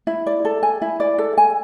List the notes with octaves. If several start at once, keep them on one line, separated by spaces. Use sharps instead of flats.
E4
D5
A4
G#5
E4
D5
A4
G#5